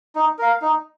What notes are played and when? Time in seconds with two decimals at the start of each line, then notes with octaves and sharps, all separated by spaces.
0.15 D#4
0.39 A#4 F5
0.62 D#4